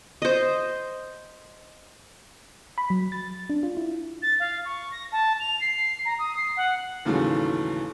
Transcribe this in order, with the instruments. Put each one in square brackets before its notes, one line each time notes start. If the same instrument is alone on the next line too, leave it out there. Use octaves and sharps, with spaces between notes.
[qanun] C5 D#5
[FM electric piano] B5
F#3
A6
D4
F4
E4
[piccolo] A6
F5
C#6
A#6
A5
F7
C7
C7
A#5
D#6
C7
F#5
[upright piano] D#2 G#2 C#3 E3 F#3 A3